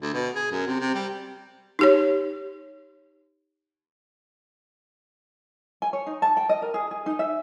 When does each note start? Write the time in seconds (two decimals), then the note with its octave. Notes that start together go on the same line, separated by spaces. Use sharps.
0.02 D2
0.14 B2
0.35 G#4
0.52 F#2
0.67 C3
0.80 C3
0.94 G3
1.79 D#4 G4 C#5
5.82 G#5
5.93 C#5
6.07 D#4
6.22 A5
6.37 G5
6.49 D#5
6.62 A#4
6.74 G#4
6.91 G#4
7.06 D#4
7.19 E5